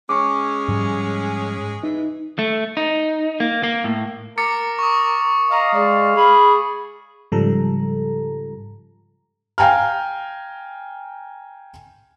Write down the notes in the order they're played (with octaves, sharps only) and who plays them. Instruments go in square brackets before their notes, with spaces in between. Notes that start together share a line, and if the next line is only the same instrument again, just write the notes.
[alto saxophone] G#3 [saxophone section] C#4 [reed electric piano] C#6 D6
[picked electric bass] G#2 F3 G3
[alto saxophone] E3 [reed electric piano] D#4
[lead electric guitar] A3
D#4
A#3
A#3
A2
[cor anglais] A#4 [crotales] D6 A6 C#7
[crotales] C#6 D#6
[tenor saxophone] D#5 [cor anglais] F5 [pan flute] A#5
[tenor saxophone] G#3 [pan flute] D5
[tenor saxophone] G#4 [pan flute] B5
[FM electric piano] G#2 C#3 F3 G3 A4 A#5
[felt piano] F5 G5 G#5 A#5 F6